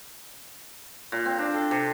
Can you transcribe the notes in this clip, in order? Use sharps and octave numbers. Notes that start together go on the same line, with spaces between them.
A#2
C4
D4
A4
C3